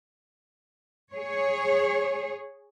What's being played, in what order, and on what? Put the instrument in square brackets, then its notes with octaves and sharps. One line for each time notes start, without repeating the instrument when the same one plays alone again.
[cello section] G#4 C#5